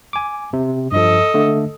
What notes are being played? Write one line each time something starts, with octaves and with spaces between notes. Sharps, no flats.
G#5 D6
C3
G2 F3 A4 D#5
D3 A3